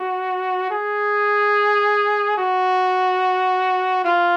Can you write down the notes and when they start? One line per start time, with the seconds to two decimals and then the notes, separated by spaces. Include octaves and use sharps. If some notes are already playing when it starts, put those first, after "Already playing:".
Already playing: F#4
0.70 G#4
2.38 F#4
4.04 F4